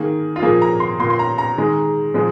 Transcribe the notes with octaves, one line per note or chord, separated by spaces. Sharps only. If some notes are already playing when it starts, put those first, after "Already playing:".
Already playing: D#3 A#3 G#4
F4
A#2 F3 A#3 G#4
A#5
C6
A#2 A#3 C6
C6
A#5
A#5
D#3 G#3
A#2 F3 G#3